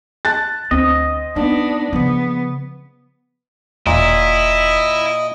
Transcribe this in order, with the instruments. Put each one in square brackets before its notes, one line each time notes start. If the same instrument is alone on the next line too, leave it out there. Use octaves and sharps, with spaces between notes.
[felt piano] A5 F#6 A6
[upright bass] D2 [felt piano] C4 [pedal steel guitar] D#5
[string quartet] B3 D4 [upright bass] D#4
[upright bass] C#3 F3 [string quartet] B3
[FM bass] E1 [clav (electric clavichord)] A#2 [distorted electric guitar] E4 [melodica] D#5